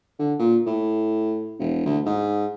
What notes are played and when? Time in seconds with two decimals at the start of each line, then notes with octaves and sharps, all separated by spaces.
0.19 D3
0.39 A#2
0.66 A2
1.59 E1
1.86 D2
2.06 G#2